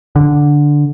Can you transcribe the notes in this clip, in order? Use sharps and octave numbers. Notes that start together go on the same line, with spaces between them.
D3